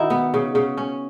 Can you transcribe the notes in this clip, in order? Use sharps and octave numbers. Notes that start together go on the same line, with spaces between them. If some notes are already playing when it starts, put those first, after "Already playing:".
Already playing: D#3 D#4 E4 F#4
B3
C#3
C#3
C#4